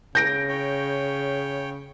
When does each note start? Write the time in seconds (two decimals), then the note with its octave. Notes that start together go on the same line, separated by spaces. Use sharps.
0.15 C#3 G6 A#6 D7
0.49 C#5 G5